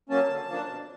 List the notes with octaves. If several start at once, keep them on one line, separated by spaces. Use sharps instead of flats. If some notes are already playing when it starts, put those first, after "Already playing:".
F#3 A#3 C#4 A5
D3
F3 A#3 D4
B2